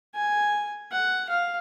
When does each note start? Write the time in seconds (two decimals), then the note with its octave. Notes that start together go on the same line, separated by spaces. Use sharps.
0.15 G#5
0.92 F#5
1.29 F5